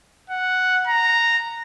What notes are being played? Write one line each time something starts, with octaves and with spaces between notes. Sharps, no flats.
F#5
A#5